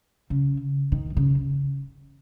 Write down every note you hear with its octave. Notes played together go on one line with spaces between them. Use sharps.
C#3
D#3
C#3